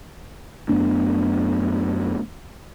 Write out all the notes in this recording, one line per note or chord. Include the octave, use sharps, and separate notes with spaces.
F#2 A3 B3 D4